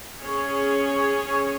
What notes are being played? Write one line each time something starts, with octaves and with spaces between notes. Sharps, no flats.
C#4 G#4 C#5